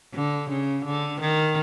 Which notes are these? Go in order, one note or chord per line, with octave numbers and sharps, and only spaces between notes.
D3
C#3
D3
D#3